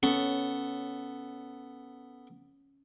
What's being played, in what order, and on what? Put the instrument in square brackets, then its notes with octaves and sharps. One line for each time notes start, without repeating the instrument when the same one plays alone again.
[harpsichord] B3 A4 C#6 [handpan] C#4